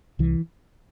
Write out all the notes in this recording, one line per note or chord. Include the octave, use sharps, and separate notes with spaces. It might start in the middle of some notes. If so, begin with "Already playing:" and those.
C2 E3